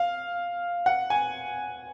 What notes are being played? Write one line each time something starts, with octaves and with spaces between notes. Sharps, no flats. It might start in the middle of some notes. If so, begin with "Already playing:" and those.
Already playing: F5
F#5
G#5